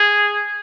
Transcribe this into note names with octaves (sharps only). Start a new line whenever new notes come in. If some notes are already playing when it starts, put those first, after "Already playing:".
Already playing: G#4